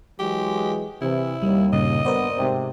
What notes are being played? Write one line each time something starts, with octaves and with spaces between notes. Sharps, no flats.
E3 F#3 G#3 G4
C3 E3 E4
D#2 G3
G2 A#2 C#3 D#5
G2 B3 A#4 C5 D5
G#2 C3